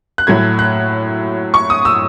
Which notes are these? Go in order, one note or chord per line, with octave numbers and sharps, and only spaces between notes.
F#6
A2 F#3 A3 G#6
F#6
C#6
D#6
E6